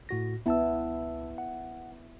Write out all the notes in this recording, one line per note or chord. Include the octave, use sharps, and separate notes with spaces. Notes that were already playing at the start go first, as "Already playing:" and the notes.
A2 F#4 A#6
C#2 B3 E4 A5 E6
F#5